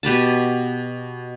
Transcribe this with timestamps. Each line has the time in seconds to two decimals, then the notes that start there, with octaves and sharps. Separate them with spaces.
0.03 B2 G4 B4 A5